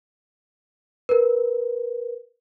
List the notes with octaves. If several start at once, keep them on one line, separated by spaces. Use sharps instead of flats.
A#4 B4